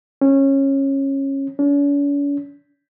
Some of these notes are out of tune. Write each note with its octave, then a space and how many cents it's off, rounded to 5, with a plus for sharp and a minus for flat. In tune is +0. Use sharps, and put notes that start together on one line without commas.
C#4 -20
C#4 +45